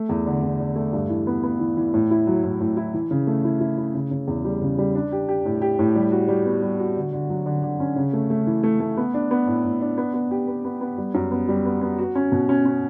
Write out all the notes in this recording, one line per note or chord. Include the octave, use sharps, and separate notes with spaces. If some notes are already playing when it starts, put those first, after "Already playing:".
Already playing: A3
E2
D3
E2
D3
A3
G2
E3
B3
B3
E3
E3
A2
E4
F#3
A2
A2
E4
E3
C#3
A3
E4
E4
E4
C#3
C#3
E2
G3
C#3
G3
D4
G4
G4
A2
G4
A2
G3
F#4
G3
B3
G3
F#4
D3
D3
F#3
D3
D3
C#4
C#3
A3
A3
E3
A3
A3
B3
D4
B3
A2
A2
D4
B3
B3
G4
B3
B3
B3
G3
F#2
B3
G3
B3
B3
F#4
C#4
B2
C#4
C#4